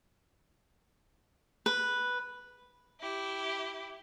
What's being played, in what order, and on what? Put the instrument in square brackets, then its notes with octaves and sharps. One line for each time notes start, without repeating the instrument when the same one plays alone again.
[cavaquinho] B4
[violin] E4 G4